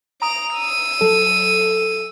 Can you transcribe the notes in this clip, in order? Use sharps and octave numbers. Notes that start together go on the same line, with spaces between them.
A#5 D#6 D7 F7
E6 D#7
F#3 A4